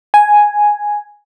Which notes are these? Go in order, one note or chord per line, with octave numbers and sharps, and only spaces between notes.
G#5